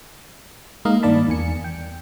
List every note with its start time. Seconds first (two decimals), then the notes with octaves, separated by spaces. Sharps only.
0.85 G#3 A#3 D#4 D#5 F5
1.03 G2 D#3 A#3 D5 A5 B5
1.29 E2 G#5 C#7
1.64 G5